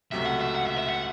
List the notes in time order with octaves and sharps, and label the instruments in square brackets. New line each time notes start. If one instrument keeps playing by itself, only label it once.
[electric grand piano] C#2 C3 F#3 A3 [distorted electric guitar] E5
[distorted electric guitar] F#5
E5
F#5
E5
E5
F#5